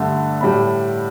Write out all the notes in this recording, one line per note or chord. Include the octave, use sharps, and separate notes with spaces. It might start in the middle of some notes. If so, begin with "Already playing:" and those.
Already playing: G2 D3 A3
A2 G3 B5